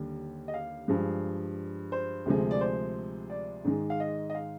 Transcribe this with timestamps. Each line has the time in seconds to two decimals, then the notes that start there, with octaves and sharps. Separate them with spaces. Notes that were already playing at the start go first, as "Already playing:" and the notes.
Already playing: D#2 D3 G3
0.48 D#5
0.54 F5
0.88 G2 F3 G#3
1.92 C5
2.26 D2 C3 F3 G#3
2.51 D5
2.61 C5
3.30 D5
3.65 G#2 D#3 G#3
3.90 F5
4.00 D#5
4.30 D#5
4.35 F5